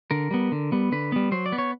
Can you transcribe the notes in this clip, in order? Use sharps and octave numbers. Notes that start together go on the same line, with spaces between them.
D3 A#4
G3 B3
D3
G3 B3
D3 B4
G3 B3
F#3 C5
D5
B3
C#5